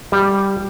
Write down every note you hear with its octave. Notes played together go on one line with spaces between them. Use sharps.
G3